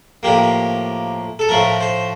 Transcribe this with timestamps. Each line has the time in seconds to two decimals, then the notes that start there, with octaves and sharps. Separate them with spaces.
0.23 A2 F3 A#3 G4
1.39 A4
1.49 A2 F3 A3 A#4
1.81 C5